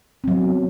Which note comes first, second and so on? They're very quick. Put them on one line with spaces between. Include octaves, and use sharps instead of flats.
C4 F#3 B3